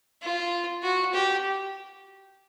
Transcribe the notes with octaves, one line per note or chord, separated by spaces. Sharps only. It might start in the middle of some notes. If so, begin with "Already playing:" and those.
F4
F#4
G4